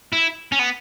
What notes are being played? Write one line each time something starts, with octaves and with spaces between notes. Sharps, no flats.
E4
C#4
B3